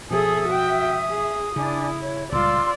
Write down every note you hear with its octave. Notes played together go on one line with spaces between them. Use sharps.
B2 F3 G#4 A4 E5 D#6
F#4 G5
G#4
C#3 D4 E4 G#5
C#5
C#2 A#2 G3 F4 D5 C6 E6